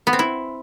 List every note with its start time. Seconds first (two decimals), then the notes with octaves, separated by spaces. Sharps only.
0.07 B3
0.13 C4
0.19 E4